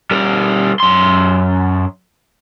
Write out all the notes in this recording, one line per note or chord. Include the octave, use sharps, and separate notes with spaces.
G3 A#4
F#2 C6